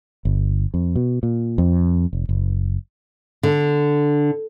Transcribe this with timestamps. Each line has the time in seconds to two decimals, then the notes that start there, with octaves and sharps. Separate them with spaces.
0.25 G1
0.74 F2
0.96 B2
1.23 A#2
1.58 F2
2.13 F1
2.29 F#1
3.43 D3